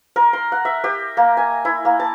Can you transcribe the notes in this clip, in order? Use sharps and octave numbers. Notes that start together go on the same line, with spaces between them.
A#4
C6
F#5
E5
G4
A#3
G#5
E4
A#3
A5